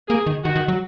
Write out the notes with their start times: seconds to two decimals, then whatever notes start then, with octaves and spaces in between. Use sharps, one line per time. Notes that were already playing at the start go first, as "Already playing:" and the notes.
0.09 A#3 G#4
0.26 D#3
0.44 D#3 F#4
0.56 D#3
0.68 F#3